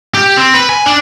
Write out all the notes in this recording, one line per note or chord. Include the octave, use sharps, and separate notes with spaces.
G4
C4
B4
G#5
D4